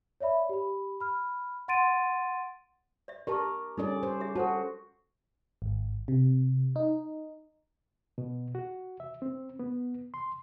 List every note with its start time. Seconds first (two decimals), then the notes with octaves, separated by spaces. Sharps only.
0.21 C#5 D5 E5 B5
0.49 G4 B5
1.00 B5 F6
1.68 F#5 C6 A6 D7 D#7
3.08 D5 E5
3.27 G4 A#4 D5 A5 C#6
3.78 G3 C#4 D#4 A4 D5
4.03 C5
4.20 G#4 E5
4.36 F#4 A4 C5 A5
5.62 G#1
6.08 C3
6.76 D#4
8.18 B2
8.55 F#4
9.00 E5
9.22 C4
9.59 B3
10.14 C6